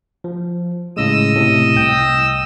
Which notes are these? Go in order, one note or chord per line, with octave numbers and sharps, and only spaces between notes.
F3
A2 C#3 G#3 D#5 D#6 E6
A2 C3
C2 G5